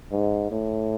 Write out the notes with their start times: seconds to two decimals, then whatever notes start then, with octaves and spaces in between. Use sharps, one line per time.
0.12 G#2
0.51 A2